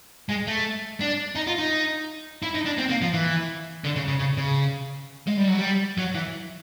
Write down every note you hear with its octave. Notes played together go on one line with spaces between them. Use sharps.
G#3
A3
D4
D#4
F4
D#4
E4
D#4
D4
C4
A#3
F3
E3
D3
C#3
C#3
C#3
C#3
G#3
G3
F#3
G3
F#3
E3